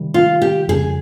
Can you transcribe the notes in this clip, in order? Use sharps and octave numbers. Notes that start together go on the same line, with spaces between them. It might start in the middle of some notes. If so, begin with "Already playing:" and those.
Already playing: C3 D#3 G3
F4
G4
F2 C#3 G3 G#4